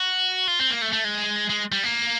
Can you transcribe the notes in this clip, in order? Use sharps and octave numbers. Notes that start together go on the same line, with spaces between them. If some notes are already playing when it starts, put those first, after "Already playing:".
Already playing: F#4
F4
C4
A#3
A3
A3
G#3
G#3
G3
A#3